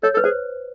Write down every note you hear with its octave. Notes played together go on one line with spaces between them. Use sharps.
A4 C#5
A4
B4
G#4 C5